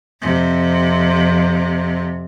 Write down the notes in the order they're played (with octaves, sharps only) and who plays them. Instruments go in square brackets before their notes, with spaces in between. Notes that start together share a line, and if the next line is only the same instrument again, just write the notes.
[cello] F2 C3